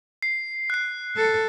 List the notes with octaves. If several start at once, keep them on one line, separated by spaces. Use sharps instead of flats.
C7
F#6 C7
A4